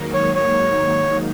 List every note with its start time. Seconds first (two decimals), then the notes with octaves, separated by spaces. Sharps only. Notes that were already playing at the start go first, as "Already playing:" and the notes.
Already playing: G#2 D#3 F#3 A#3 D#4
0.14 C#5
0.35 C#5